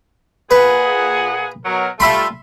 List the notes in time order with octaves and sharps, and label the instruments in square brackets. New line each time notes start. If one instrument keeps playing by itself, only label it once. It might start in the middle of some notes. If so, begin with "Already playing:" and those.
[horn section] A#2 G#4 F#5 [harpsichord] B4
[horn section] B2 F#3 A#4
[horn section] G3 A3 F4 [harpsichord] E5 B5 C6